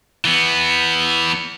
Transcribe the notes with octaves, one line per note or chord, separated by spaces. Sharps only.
E3 B3